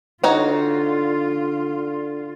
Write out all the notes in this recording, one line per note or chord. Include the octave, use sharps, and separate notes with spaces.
D3 D#4 F4 F#4 C#5